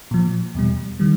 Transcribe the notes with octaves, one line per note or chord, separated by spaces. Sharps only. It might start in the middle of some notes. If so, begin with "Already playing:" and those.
A#2 F3
E2 B2 G3
D#3 G3